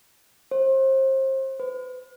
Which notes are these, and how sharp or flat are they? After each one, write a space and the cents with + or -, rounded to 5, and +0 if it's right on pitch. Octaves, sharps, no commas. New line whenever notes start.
C5 +30
B4 +40